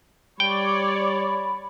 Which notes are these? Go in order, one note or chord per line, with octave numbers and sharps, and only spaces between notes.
G3 C#5 D5 G5 B5